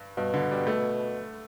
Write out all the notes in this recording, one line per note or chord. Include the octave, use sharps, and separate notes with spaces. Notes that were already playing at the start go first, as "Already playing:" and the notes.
Already playing: G2
G2 B2
D3
G3
A3